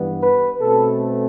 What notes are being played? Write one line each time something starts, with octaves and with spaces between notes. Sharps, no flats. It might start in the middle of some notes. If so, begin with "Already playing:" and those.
Already playing: G2 E3 B3
B4
B2 A3 C4 A4